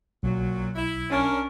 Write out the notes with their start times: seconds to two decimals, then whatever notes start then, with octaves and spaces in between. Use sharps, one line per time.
0.23 B1 A#2 F#3
0.75 E4
1.11 C#4 D4 A#4